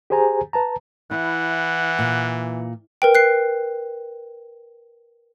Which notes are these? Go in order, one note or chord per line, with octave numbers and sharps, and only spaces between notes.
G4 G#4 C5 G#5 A#5
B4 A5 A#5
E3 E4 F#5
A#2
A#4 B4 G5
F#6 C7